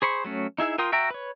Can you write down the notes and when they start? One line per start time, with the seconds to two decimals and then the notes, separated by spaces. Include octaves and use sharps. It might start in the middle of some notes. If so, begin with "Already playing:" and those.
0.02 G#4 C5 B5 C#6
0.25 F#3 A3 C#4
0.58 D#4 E4 G#4 E5
0.78 F4 A#4 G5 C6 D#6
0.92 F#4 E5 G5 A#5
1.10 B4 C#5